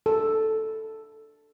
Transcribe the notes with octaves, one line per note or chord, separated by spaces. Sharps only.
A4